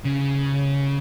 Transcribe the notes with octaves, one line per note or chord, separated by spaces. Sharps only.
C#3